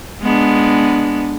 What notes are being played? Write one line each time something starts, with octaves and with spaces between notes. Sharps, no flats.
G#3 B3 D4